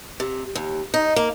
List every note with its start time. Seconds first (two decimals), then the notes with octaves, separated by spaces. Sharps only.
0.20 C3
0.55 D#2
0.94 D#4
1.16 A#3